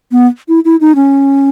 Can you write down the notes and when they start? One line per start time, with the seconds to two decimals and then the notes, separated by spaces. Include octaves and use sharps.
0.12 B3
0.49 E4
0.65 E4
0.81 D#4
0.96 C#4